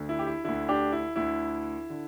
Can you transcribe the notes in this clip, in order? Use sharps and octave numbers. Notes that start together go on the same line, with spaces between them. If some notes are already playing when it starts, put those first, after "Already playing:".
Already playing: D2 D3
E4
G4
E4
D2 D3 E4
D4 G4
E4
D2 D3 E4
D3